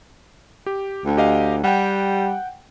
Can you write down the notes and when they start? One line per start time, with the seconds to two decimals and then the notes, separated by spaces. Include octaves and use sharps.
0.66 G4
1.05 D2
1.17 G4 D#5 F5
1.64 G3 F#5 G5